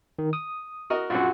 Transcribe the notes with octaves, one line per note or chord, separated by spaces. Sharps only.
D#3
D#6
F#4 A#4 D#5
A#1 F#2 F4 F#4 F#5